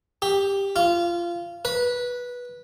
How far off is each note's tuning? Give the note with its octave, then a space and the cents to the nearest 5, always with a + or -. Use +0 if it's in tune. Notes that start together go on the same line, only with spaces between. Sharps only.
G4 +10
F4 -20
B4 -15